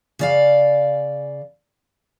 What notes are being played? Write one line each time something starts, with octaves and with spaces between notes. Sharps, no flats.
C#3 D5 F5